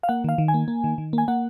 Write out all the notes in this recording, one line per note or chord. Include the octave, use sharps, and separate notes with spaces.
F5
A#3 F#5
D#3 F5
D#3
G#5
A#3
A#3
D#3
D#3
A#3 G#5
A#3 F#5